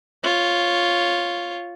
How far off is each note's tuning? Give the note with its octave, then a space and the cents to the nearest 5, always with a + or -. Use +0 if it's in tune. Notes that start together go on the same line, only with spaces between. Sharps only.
F4 +0 C#5 +0